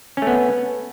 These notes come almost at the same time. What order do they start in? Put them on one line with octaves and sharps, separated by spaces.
C#4 A3 B3